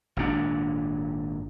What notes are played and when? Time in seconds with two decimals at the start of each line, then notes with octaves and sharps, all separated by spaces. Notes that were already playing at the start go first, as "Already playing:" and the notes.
0.17 G#1 A#2 D4